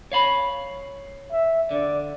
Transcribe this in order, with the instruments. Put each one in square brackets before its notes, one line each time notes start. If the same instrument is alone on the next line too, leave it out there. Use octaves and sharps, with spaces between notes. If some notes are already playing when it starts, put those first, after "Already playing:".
[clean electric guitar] C#5 F5 B5
[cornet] E5
[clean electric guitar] D3 [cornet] D5